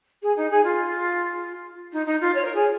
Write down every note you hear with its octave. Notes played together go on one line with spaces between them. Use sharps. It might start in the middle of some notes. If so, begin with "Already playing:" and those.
G#4
D#4
G#4
F4
D#4
D#4
F4
C#5
A#4
G#4